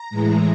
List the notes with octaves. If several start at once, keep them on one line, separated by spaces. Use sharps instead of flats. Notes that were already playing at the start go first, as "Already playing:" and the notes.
Already playing: A#5
A2 E3 G#3